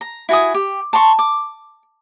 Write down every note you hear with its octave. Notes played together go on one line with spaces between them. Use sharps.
A#5
E4 F#4 G#5 D#6
G4
A5 A#5 C6 C#6
D6